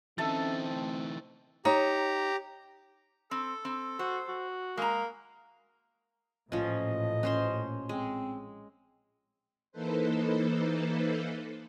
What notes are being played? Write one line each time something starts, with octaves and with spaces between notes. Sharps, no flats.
E3 C4 C#4 D#4 A4 E5 A5
A3
D#4 G4 C#5 A#5
C4 A4
C4
F#4 C5
F#4
G#3 A#3 A#5
A1 A#2 F3 C#4 D#5
C#4 C5 C6
G#3 C4
E3 A#3 D#4 A4 B4 C5